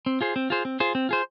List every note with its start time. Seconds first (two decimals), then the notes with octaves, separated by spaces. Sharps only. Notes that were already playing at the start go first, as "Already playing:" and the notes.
0.06 C4
0.21 F4 G#4 C5
0.36 C4
0.50 F4 G#4 C5
0.65 C4
0.80 F4 G#4 C5
0.95 C4
1.09 F4 G#4 C5